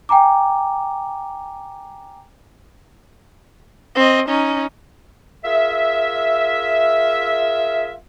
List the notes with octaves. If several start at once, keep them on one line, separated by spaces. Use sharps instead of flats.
G5 G#5 A#5 D6
C4 D#5
C#4 D#4
F4 G#4 A#4 E5